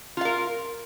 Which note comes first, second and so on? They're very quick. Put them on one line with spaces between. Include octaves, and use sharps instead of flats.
F4 F5 A#4